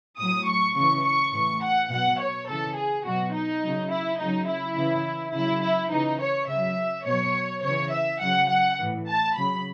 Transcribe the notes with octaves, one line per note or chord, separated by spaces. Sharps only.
A2 F#3 D#6
C#6
C#3 E3 C#6
C#6
A2 E3 C#6
F#5
B2 F#3 F#5
C#5
C#3 E3 A4
G#4
B2 F#3 F#4
D#4
C#3 F#3
E4
C#3 F#3 D#4
E4
C#3 E3
C#3 F#3 E4
E4
C#3 E3 D#4
C#5
C#3 F#3 E5
B2 F#3 C#5
C#3 E3 C#5
E5
C#3 F#3 F#5
F#5
A2 E3
A5
C#3 F#3 B5